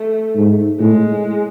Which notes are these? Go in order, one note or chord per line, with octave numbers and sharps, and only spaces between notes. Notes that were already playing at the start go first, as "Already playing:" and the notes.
Already playing: A3
G#2
A2 G#3